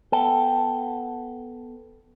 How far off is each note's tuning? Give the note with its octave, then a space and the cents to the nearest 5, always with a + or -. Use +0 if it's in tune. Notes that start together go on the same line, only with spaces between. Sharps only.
B3 +0 A4 +0 G5 +0